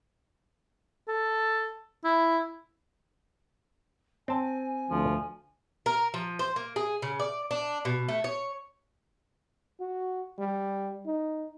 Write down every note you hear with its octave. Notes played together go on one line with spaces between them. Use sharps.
A4
E4
C4 G#5 A5
D2 F3
A#4
F3
C5
A#3
G#4
C#3
D5
D4
B2
A3
C#5
F#4
G3
D#4